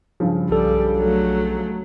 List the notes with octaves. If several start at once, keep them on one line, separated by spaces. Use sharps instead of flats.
G2 C#3 F3
B1 G3 A4
F#3 A3